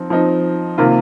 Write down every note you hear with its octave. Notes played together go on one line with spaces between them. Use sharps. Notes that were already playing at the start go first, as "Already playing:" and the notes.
Already playing: F3 C4 D#4
F3 C4 D#4
C3 D#3 A#3 F4